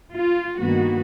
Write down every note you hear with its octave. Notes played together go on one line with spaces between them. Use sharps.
F4
G2 D#3 A#3 B3 F#4